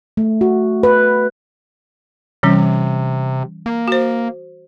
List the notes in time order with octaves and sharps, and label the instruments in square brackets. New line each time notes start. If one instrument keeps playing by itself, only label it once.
[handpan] A3
F#4
B4
[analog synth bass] C3 [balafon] E3 G3 C#4
[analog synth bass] A#3
[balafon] F#4 C5